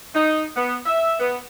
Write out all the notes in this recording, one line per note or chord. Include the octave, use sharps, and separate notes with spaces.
D#4
B3
E5
B3